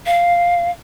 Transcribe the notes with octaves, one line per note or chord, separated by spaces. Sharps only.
F5